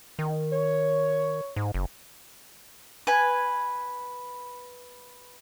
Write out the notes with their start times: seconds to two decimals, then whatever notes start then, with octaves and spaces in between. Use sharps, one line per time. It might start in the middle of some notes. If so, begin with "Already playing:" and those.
0.19 D#3
0.52 C#5
1.56 G#2
1.74 F#1
3.07 B4 G#5